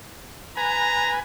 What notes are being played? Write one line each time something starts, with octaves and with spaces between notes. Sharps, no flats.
B4 G#5 A#5